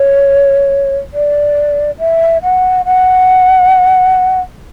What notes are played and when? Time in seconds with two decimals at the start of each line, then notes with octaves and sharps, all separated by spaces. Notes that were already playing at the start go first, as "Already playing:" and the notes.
Already playing: C#5
1.14 D5
1.99 E5
2.43 F#5
2.86 F#5